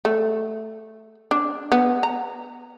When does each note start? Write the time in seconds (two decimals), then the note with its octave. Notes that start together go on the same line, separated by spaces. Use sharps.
0.05 A3
1.31 D4
1.72 B3
2.03 A#5